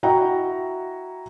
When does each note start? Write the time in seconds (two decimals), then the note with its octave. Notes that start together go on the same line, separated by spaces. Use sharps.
0.03 E4 F#4 D#5 F#5 G5 A#5